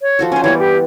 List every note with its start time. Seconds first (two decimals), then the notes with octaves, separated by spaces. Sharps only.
0.01 C#5
0.19 F3 F#4 A4
0.32 C#4 C5 G#5
0.44 E3 G3 B3 C#5
0.59 G4